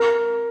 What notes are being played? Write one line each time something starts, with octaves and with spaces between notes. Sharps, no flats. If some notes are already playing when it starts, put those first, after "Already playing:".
Already playing: A#4